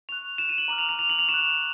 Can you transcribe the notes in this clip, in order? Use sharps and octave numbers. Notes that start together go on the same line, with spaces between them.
C#6 F#6 F7
E7
D#7
F#7
A#5 D6 F6 F#7
F7
F7
F7
F#7
F7
C#6 E7
F#6